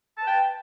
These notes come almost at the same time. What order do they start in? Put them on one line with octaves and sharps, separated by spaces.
A5 B4 G5